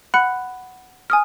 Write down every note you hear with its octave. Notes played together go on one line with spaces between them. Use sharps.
F#5 B5 F#6 C#7
G#5 D#6 F6